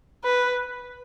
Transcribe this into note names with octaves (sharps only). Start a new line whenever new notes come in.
B4